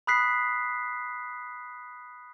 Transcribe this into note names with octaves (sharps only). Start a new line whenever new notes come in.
B5 D#6 F#6 B6 C7